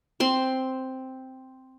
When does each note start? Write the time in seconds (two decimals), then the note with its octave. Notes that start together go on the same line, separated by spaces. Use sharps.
0.20 C4 C6